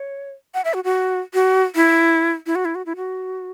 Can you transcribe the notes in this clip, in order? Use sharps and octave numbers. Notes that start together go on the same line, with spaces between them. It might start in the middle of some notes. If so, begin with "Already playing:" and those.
Already playing: C#5
F#5
E5
F#4
F#4
F#4
E4
E4
F#4
E4
F#4
E4
F#4